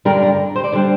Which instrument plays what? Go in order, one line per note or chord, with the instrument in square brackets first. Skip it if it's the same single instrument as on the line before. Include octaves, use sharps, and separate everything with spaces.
[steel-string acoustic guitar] G2 D3 G3 D4 A#4
A#4
C5
D5
D3 G3 D4 C5